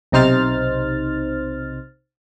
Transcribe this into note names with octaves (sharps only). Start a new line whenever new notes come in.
B1 C3 D#4 C5 F6 A6